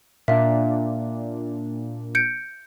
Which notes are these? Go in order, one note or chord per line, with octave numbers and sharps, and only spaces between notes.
A#2 D4 E5 F5
G6 C#7 D7